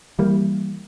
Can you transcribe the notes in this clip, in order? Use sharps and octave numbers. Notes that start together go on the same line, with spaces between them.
E3 G3 A#3